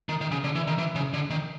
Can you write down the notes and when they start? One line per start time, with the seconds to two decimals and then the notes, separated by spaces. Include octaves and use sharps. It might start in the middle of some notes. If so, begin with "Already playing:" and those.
0.09 D#3
0.21 D#3
0.32 C#3
0.44 D3
0.55 E3
0.67 D#3
0.78 E3
0.95 C#3
1.14 D3
1.30 D#3